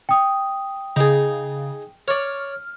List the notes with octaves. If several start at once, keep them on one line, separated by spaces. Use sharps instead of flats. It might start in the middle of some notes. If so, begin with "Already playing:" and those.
G5 D#6
C#3 D#4 G#4
C#5 D5 F6